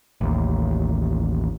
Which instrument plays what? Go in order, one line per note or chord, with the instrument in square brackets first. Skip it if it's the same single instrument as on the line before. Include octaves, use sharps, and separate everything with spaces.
[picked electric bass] A1 D#2